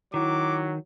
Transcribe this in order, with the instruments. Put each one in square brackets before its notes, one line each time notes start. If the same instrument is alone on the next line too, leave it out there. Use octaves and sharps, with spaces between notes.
[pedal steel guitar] D#3 [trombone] F#3 [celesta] E4 [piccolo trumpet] D6